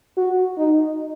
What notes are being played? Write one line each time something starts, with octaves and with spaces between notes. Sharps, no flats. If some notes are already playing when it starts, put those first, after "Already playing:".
F#4
D#4